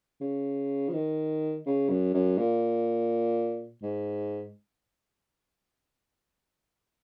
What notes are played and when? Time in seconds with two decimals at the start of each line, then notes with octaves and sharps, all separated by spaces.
0.21 C#3
0.88 F3
0.94 D#3
1.66 C#3
1.89 F#2
2.14 F#2
2.38 A#2
3.83 G#2